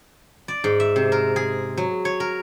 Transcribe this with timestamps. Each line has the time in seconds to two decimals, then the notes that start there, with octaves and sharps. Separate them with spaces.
0.48 D5
0.64 G#2
0.80 E5
0.96 C3
1.12 A#4
1.36 G#4
1.77 F#3
2.05 C#5
2.20 A#4